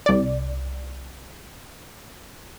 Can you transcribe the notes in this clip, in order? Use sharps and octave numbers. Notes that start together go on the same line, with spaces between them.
C2 D5